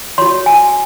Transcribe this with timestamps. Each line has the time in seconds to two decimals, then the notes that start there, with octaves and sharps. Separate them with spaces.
0.18 F#4 C#5 C6
0.46 G#5